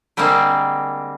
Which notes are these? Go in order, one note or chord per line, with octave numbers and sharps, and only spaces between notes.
D3 G3 G#3 A#3 C4